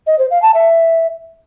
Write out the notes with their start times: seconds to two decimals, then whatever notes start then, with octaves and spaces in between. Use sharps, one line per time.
0.07 D#5
0.19 C5
0.30 F5
0.42 A5
0.54 E5